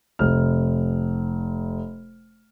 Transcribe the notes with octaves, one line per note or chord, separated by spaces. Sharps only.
F1 F6